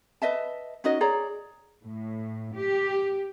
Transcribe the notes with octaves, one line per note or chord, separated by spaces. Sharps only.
B4 D#5 E5 A5
C#4 D#4 F#4 D#5
G#4 C#5 D5 A#5
A2
G4